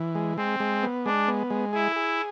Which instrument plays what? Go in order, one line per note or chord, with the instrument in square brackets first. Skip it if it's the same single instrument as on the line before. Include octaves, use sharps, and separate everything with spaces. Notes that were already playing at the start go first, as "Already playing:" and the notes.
Already playing: [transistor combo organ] E3
G#3
[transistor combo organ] G#3 [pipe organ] C4
[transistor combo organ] G#3
B3
[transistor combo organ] G#3 [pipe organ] D4
[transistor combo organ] B3
G#3
[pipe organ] E4 [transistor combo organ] G#4
[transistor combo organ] G#4